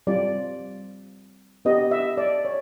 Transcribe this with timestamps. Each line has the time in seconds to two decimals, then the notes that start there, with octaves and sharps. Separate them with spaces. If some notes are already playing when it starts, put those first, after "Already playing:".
0.07 G3 C4 F4 D5
1.65 B3 D4 G4 D#5
1.91 E5
2.18 D5
2.45 C#5